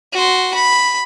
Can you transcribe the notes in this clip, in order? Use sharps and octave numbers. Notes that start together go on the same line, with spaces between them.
F#4 C6
B5